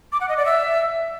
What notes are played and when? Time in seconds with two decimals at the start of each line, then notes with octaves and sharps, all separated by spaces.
0.12 D6
0.21 F#5
0.29 D#5
0.37 D5
0.46 E5